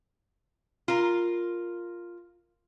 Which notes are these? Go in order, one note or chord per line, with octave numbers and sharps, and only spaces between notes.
F4 A#4